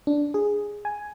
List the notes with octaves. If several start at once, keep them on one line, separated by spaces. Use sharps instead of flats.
D4
G#4
G#5